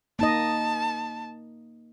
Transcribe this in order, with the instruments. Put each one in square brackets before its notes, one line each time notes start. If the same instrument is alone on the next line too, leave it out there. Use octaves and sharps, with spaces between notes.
[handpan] A#3 D#4 D#5 [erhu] A5